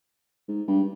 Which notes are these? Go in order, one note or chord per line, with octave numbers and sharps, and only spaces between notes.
G#2
G2